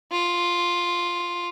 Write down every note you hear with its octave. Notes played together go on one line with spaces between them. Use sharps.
F4